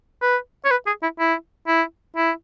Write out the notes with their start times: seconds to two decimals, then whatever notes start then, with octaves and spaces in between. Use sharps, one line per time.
0.22 B4
0.65 C#5
0.71 B4
0.87 G#4
1.03 E4
1.19 E4
1.67 E4
2.16 E4